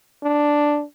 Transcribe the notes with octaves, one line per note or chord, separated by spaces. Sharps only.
D4